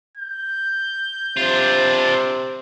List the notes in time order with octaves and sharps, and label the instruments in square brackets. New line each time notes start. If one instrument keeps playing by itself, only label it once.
[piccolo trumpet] G6
[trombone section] C3 C5 [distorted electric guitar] D4 F4